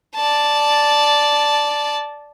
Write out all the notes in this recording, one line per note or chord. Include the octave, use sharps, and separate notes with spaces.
D5 A5